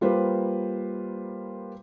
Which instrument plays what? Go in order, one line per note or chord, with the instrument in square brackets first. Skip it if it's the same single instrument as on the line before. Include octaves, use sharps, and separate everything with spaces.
[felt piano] G3 A#3 F4 G4 B4 C5